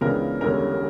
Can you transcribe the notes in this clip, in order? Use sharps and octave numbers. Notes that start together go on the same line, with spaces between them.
C#2 C#3 E3 B3 D4 A#4
E1 E2 D3 G3 C#4 A#4